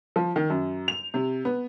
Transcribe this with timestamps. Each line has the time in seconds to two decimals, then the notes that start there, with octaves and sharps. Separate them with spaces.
0.16 F3
0.36 D#3
0.50 F#2
0.88 F7
1.14 C3
1.45 B3